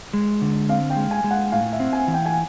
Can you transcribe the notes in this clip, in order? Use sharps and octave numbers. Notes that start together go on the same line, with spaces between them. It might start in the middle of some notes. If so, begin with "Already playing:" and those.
G#3
D3
C4 F5
G5
G#3
G#5
G#3
F#5
A2 F5
E5
C4
G#5
E3
G5
G#5